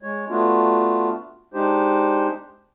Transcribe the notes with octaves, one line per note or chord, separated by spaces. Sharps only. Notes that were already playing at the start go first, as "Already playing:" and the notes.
G#3 C#5
A3 B3 D4 F4 F#4
G#3 D4 D#4 G4 C5